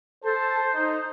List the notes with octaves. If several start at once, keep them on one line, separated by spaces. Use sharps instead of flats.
A4 C5 A5
D#4